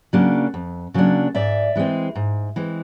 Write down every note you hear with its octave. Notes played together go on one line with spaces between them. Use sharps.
C#3 F#3 A#3 D4
F2
C#3 F#3 A#3 D4
G#2 D5 E5
E3 G#3 C4
G#2
E3 G#3 C4